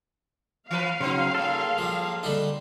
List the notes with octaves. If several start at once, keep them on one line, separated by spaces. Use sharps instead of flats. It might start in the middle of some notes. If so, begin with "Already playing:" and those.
E3 F3 B4 F5
C#3 F#3 B3 C4 D#4
G#2 F#3 A#3 A4
F3 G3
D3 G3 D#4